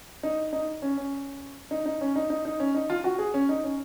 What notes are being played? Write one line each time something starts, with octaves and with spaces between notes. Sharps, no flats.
D#4
D#4
C#4
C#4
D#4
D#4
C#4
D#4
D#4
D#4
C#4
D#4
F4
F#4
G#4
C#4
D#4
C#4